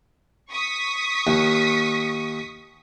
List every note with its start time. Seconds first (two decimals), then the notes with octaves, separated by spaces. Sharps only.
0.51 C#6 D#6 B6
1.27 D#2